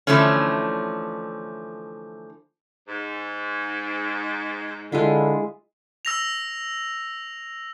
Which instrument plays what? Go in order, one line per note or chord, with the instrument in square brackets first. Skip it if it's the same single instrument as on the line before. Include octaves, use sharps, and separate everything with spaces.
[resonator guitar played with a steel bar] D3 E3 F3 A3 C#4
[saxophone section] G#2
[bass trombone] D3 [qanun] G#3 E4 F4
[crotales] E6 A#6 F7